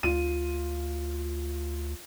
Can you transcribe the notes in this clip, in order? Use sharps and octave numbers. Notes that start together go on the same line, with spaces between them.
D2 F4 D#7